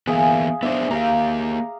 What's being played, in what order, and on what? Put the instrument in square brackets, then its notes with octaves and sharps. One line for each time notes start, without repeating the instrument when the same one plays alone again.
[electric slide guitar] E3 A#3 B3 [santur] G#4 E5 F5
[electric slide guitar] B3 D4 C5 [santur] E5 D6 D#6
[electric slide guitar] A#3 G4 [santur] F5 A#5